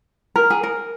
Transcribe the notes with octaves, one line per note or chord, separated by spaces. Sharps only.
A#4
G#4
A#4